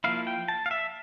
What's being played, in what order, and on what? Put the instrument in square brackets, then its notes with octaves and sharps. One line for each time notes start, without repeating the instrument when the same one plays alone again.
[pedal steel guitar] F3 A#3 E4 F5
G5
A5
F5
E5